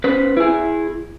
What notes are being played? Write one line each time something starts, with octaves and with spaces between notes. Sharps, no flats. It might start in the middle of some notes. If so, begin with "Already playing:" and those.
C#4 B4 C5
E4 G#4